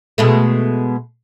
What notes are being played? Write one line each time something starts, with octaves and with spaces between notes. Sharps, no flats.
B2 G#3 A3